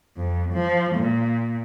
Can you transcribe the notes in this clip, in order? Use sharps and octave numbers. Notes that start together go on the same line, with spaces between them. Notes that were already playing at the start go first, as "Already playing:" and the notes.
F2
F3
A#2